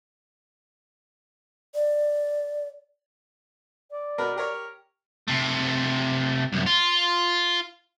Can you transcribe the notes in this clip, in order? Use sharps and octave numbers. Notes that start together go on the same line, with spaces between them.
D5
D5
B2 A#4 B4
G4 A#4 C#5
C3 A3
C2 F#2
F4